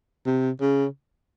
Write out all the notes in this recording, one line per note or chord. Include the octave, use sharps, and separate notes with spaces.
C3
C#3